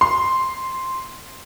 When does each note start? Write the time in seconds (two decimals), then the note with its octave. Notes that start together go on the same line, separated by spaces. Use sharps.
0.01 C6